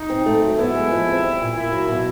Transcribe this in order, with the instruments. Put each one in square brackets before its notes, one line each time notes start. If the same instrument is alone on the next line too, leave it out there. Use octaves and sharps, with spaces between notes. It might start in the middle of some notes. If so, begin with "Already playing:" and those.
Already playing: [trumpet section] D#4
[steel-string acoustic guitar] C4
A3
F#3
[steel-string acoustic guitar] B3 [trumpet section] E4
[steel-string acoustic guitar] G#3
F3
C4
G3
A#2
[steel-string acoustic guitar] A#3 [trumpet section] E4
[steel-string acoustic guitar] F#3
B2